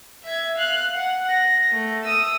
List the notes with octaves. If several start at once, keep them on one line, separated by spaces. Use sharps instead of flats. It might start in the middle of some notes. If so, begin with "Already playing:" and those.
E5 G#6
F5 F#6
F#5
A#6
A3
D#6 E6